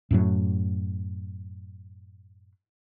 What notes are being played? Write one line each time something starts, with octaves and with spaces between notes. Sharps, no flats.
F#2 A2 F#3